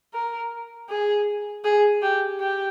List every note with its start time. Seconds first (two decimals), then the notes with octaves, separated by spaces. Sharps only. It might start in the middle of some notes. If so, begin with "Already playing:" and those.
0.14 A#4
0.89 G#4
1.64 G#4
2.02 G4
2.40 G4